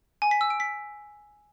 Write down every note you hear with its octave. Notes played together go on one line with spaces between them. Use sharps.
G#5
B6
E6
D7
B6